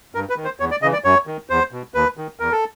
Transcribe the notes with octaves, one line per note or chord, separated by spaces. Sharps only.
G2 A#4
B4
D#3
C5
E2 C#5
D5
C#3 E3 D#5
D5
F#2 C#5
D#3
E2 C5
B2
D#2 B4
D#3
E2 A#4
A4